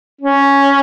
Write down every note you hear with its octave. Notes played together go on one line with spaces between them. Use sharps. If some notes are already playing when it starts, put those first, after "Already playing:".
C#4